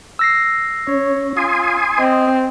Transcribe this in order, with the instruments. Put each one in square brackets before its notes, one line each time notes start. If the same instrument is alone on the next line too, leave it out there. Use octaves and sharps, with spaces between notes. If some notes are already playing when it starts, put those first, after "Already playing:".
[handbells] E6 A#6 C7
[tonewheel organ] C#4 [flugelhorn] C#5
[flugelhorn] F4 [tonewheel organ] G#5 C6 D#6
[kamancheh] C4 [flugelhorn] D#5